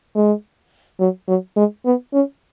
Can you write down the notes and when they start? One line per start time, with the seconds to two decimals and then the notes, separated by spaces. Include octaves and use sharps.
0.15 G#3
1.00 F#3
1.28 F#3
1.56 G#3
1.85 B3
2.13 C#4